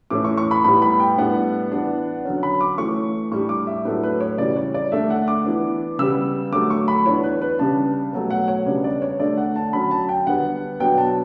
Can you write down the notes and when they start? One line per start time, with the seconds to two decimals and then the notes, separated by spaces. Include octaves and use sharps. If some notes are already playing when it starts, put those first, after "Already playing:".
0.10 A2 E3 A3 C#4 D6
0.25 C#6
0.37 C#6
0.51 B5
0.64 A2 G3 B3 B5
0.82 B5
1.00 G5
1.18 A2 G3 B3 D4 F#5
1.72 E3 B3 D4
2.25 D3 F#3 C#4
2.43 B5
2.61 D6
2.78 E3 A3 C#4 C#6
3.31 A2 G3 D4 C#6
3.49 D6
3.67 E5
3.85 A2 F#3 A3 D4 B4
4.03 B4
4.20 C#5
4.38 C#3 E3 G3 D5
4.56 C#5
4.74 D5
4.92 D3 A3 D4 E5
5.10 F#5
5.28 D6
5.45 E3 B3 D4
5.99 C#3 G3 B3 E6
6.52 D3 F#3 A3 D6
6.70 C#6
6.88 B5
7.06 E3 B3 D4 C#5
7.23 B4
7.42 B4
7.59 C#3 G3 D4 A5
8.13 B2 F#3 A3
8.30 F#5
8.48 C#5
8.66 C#3 G3 B3 D4 C#5
8.84 D5
9.02 C#5
9.20 D3 A3 D4 D5
9.37 F#5
9.56 A5
9.73 D3 F#3 C#4 B5
9.91 A5
10.09 G5
10.27 D3 G3 B3 F#5
10.80 B2 F#3 B3 D4 G5
10.98 A5